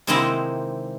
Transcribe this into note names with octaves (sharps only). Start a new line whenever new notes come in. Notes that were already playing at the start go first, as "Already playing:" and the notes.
C3 D#3 G#3 A#3 C4 E4